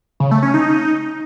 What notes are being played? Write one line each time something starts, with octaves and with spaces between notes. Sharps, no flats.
C#3
A3
C#4
D#4